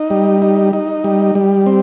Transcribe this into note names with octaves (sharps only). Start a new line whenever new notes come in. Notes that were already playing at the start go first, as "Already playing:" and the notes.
Already playing: D#4
G3
D#4
D#4
G3
G3
C4